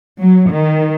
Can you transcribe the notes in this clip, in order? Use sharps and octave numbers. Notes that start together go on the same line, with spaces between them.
F#3
D#3